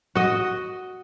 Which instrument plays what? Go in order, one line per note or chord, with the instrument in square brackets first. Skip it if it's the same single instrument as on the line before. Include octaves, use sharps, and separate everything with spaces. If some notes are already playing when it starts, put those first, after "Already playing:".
[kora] F#4 D#5